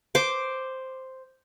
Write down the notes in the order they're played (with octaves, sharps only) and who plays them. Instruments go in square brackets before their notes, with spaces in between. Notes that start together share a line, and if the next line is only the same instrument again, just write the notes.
[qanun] C5 D6